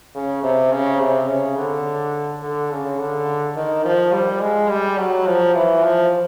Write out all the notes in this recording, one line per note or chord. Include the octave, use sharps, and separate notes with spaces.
C#3
C3
C#3
C3
C#3
D3
D3
C#3
D3
D#3
F3
G3
G#3
G3
F#3
F3
E3
F3